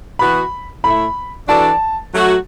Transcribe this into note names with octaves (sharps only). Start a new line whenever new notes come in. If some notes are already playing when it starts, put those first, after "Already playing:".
E3 B3 F#4 B5
A2 A3 E4 B5
E3 D4 F#4 A4 D5 A5
F#3 A3 F#4